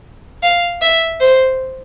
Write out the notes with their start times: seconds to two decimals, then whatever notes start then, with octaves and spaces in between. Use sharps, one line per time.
0.43 F5
0.82 E5
1.21 C5